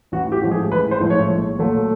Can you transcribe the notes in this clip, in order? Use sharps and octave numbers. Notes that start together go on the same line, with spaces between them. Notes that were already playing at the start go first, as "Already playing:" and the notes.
A1 F#4
G4
A2 F3 G#3
G#4
A1 B4
C5
A2 F3 G#3
C#5
A#1
A#2 F#3 A3